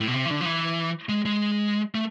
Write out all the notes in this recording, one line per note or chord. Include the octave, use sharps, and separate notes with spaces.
A2
B2
C3
E3
D3
F3
E3
G#3
G#3
A3